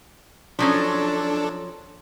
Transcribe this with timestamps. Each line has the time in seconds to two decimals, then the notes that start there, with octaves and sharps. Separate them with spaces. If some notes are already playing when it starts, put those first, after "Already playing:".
0.59 F3 F#3 C#4 D4 A4